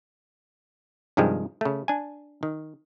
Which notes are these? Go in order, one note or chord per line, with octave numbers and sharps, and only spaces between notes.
G2 C3 D#3 F3 G3 G#3
C#3 A3
D4 G#5
D#3